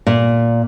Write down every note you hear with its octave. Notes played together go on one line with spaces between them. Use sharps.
A#2